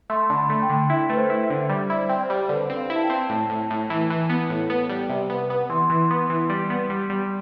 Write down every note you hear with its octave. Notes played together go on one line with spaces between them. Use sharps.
A3 C6
D3
B5
A3
G5
D3
E4 E5
A3 B4
C5
E4
E5
D3
E5
G3 D5
E4
C5
C4
C5
G3
D3 B4
C4
F5
E4
A5
G5
C4
A2 A5
A2
A2
E3
E3
B3
A2
B3
G3
C3
B3
B3
E3 C6
E3
B3
E3
G3
B3
G3
G3